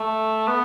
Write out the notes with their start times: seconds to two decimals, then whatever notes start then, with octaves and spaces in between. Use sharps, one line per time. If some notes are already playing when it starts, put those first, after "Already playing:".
Already playing: A3
0.47 B3